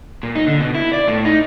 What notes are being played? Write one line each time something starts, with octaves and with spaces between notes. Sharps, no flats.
A#2
D#4
D3
B2
E4
D5
A2
D#4